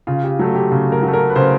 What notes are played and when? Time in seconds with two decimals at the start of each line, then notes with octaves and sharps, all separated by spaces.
0.07 C#3 F4
0.23 G4
0.39 F#3 A3
0.55 G4
0.72 C#3 G4
0.92 A#4
1.03 F#3
1.08 A3
1.13 A#4
1.30 B4
1.36 C#3 C5